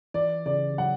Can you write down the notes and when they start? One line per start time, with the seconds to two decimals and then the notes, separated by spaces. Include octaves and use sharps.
0.14 E3 D5
0.46 C#3 D5
0.78 F#3 F#5